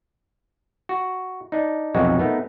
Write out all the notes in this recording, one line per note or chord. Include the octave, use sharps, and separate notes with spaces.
F#4
D4 D#4
B1 F2 C3 G#3 D#4 F#4
A3 B3 D#4 A#4